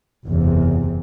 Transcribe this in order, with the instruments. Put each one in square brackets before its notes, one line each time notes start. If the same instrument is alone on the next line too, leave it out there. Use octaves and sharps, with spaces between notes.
[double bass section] F#1 E2 C3